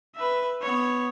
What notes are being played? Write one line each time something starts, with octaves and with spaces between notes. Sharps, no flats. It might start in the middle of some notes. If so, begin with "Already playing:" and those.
B4 E5
B3 C#5